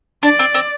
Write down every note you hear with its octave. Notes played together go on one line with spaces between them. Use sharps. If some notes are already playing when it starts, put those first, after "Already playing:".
D4 D5
C4
C4